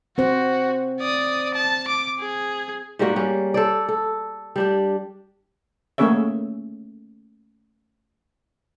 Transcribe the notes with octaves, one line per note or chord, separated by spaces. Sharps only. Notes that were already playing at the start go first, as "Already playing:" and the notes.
C4 F#4 C5
D5 D#6
A5
D6
G#4
G#2 G3 A#3 F#4
G3 C#4
A4 C5 D5
A4
G3 D4 G4
A3 A#3 C#4 G#4 C#5 E5